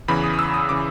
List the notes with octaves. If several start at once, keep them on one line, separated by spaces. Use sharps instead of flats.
E2 C#3 E3 B5
D#6
D#6
E6
D#6
C#3 E3 D6